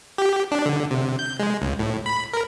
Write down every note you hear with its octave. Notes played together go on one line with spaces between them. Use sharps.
G4
D4
D3
C3
G6
G#3
C#2
A2
B5
A#4